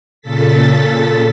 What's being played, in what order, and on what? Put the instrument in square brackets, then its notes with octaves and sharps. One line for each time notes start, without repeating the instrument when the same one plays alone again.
[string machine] A#2 C#3 A4 A6 B6